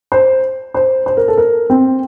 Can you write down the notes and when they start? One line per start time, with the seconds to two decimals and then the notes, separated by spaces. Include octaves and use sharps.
0.12 C5
0.74 C5
1.06 C5
1.17 A#4
1.28 A4
1.37 A#4
1.70 C4